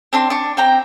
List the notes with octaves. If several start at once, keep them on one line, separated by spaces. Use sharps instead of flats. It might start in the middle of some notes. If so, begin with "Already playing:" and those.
C4 D4 C6
D4 C#6
C4 G5 A#5